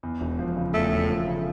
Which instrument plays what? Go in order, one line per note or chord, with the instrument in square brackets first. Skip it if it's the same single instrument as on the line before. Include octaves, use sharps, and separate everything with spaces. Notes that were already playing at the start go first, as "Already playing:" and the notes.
[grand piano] E2
E1
F3
C#3
[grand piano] E2 [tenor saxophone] A3
[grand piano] E1
F3
C#3